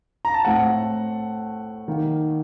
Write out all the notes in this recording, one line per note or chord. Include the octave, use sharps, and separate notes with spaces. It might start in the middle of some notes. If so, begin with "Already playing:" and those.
A#5
A5
A2 A3 C4 F#5
D#3 A#3